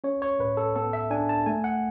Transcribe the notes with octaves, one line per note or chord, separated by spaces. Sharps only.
C#4 C#5
C#5
A2 B4
A4
B3 A4
E5
D4 G#5
A5
A3 G#5
F#5